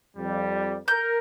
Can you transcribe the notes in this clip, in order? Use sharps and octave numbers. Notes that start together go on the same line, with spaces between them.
F2 G3
A#4 G6